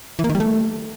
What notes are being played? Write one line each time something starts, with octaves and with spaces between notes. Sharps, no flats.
E3
A#3
D#3
G3
A3